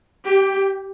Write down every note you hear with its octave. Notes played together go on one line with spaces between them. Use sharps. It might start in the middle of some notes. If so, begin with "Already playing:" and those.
G4